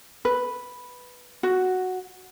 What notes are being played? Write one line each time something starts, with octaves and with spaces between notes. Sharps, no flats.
B4
F#4